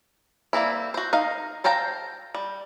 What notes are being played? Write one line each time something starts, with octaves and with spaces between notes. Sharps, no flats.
G3 A#3 C4 E4
F#4 C5
D#4 A#4 F5
A4 C5 F5 G5 A#5
G3